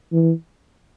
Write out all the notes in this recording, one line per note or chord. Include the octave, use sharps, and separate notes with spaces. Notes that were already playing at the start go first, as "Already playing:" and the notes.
E3